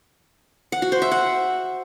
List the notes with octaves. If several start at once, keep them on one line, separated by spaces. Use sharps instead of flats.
F#5
F#4
C5
E5
F#5